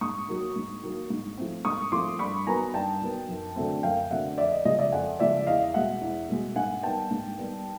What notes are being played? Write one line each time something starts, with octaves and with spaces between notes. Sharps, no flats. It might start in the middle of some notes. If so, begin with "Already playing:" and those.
G#2 C#6 D#6
D#3 F#3 A#3
G#2
D#3 F#3 A#3
G#2
F3 A3 C4
G#2 C#6 D#6
F3 A3 C4 C6 D6
G2 B5 C#6
D#3 F#3 B3 G#5 A#5
G2 G5 A5
D#3 F#3 B3
F#2
D3 F#3 A3 C4
F#2 F5 G5
D3 F#3 A3 C4 E5 F#5
F2 D5 E5
D#5
C#3 F3 G#3 D#5
D5 E5
F2 F#5 G#5
C#3 F3 G#3 D5 E5
E2 D#5 F5
B2 G#3 E5 F#5
E2
B2 G#3
G#2 F#5 G#5
D#3 G3 B3 G5 A5
G#2
D#3 G3 B3